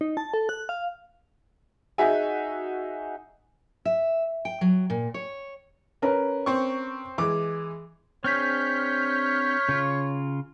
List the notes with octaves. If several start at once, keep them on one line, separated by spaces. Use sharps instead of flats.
D#4
A5
A4
F#6
F5
D#4 F#4 G#4 D#5 E5 G#5
E5
G5
F#3
A#2
C#5
C#4 A#4 B4
C4 C#6
E3 G#3 D6
C4 D4 G#4 C#5 F6 G6 B6
C#3 F4